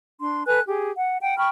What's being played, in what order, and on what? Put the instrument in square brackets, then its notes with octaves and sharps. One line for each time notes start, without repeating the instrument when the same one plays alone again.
[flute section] D4 C6
A4 B4 G#5 F#6
G4 G#4
F#5
F#5 G5
G5 B5 C#6 F6